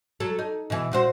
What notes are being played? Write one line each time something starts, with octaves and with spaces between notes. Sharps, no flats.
F#3 A4
D#4
B2 E3
A#2 F#4 C5